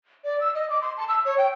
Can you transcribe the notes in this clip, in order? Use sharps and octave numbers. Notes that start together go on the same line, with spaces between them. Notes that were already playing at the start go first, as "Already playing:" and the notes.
D5
E6
D#5
D6
C6
A5
E6
C#5
G5